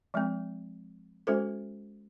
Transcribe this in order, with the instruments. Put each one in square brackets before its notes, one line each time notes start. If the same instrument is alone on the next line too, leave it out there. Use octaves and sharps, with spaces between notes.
[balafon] F3 G#3 C4
G#3 C#4 F#4 A4 C5